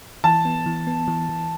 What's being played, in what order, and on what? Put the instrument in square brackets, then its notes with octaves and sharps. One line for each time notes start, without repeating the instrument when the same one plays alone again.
[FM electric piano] E3 [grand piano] A5
[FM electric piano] B3
E3
B3
E3
E3